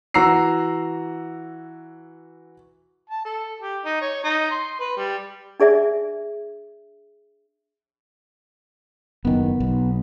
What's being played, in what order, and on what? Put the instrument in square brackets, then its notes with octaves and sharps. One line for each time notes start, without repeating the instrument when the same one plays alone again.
[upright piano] E3 F#4 A#5 E6 C7
[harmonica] A5
A4
G4
D#4
C#5
D#4
C6
B4
G3
[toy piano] D4 G#4 D5 E5
[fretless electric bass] F#1 D#3 [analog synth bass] B3
[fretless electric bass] B1